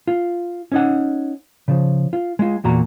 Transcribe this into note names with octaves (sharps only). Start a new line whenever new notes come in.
F4
C#4 D#4 F#5
C#3 F3
F4
G#3 F4
E2 A#2 F#4 A#5